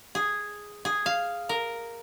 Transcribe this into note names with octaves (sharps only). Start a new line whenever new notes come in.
G#4
G#4
F5
A#4